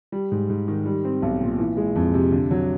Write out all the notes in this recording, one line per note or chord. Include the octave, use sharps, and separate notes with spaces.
G3
G#2
G#2
D#3
G3
C4
B1
A#2
E3
G#3
F2
C3
D3
F#3